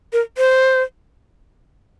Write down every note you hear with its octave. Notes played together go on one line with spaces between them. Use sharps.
A#4
C5